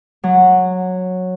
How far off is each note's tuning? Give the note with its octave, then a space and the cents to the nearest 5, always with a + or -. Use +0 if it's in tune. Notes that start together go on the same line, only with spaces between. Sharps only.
F#3 -10